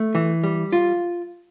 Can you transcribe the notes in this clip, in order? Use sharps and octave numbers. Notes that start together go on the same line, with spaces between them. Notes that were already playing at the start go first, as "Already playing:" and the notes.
Already playing: A3
E3
G3
F4